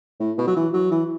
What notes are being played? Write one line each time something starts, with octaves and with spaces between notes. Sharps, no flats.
A2
B2
F#3
E3
F#3
E3